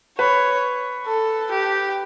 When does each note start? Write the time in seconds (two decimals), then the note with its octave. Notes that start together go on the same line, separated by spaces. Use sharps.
0.18 B4 C#5
1.07 A4
1.51 G4